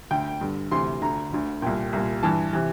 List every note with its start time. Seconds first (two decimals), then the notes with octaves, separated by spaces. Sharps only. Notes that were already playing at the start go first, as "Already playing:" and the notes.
0.11 D2 D3 G5
0.41 G2 D3
0.71 D2 C3 E3 C6
1.01 D2 D3 A#5
1.33 D2 D3
1.62 C2 A#2 G5
1.93 C2 A#2
2.23 G2 E3 A5
2.53 C3 E3